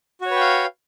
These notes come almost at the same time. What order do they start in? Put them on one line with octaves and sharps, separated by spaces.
F#4 C#5 B4 G5 F5